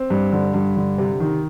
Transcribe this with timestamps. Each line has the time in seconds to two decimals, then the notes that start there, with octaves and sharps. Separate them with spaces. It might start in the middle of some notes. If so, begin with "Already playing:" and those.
Already playing: C4
0.10 G2
0.32 D3
0.54 G2
0.76 D3
0.98 C3
1.20 D#3